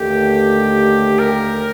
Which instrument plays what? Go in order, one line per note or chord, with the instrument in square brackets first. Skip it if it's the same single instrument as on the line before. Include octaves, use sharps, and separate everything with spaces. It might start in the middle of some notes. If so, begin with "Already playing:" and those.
Already playing: [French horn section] D#2 D3 A3 [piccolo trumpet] G4
[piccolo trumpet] A#4